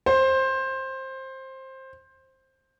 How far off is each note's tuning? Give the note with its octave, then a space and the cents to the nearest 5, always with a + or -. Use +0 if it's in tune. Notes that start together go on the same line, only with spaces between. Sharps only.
C5 +15